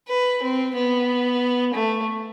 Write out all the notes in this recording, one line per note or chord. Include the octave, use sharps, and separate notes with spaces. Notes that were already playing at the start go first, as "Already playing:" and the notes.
B4
C4
B3
A3